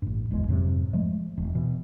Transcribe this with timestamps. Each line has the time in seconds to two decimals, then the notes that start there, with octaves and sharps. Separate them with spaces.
0.02 A1 G2
0.30 D1 G1 E2 G#3
0.48 F2 G#2 C3 F#3
0.93 F3 G#3 A3
1.38 E1
1.55 B2 E3